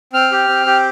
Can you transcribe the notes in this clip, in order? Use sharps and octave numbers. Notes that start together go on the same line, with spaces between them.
C4 F6
G4
C4
G4